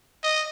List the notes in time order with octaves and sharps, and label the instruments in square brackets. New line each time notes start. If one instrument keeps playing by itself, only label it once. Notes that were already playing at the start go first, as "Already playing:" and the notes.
[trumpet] D#5